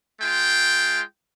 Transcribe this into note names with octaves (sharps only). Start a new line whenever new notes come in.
G#3 F4 G5